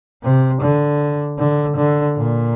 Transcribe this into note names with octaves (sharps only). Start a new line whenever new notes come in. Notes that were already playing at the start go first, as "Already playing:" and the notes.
C3
D3
D3
D3
A#2